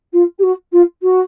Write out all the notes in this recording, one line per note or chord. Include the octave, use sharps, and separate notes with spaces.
F4
G4
F#4
F4
F#4